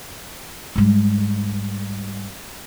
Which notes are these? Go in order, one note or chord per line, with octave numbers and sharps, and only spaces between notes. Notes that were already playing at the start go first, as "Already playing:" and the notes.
G#2 G3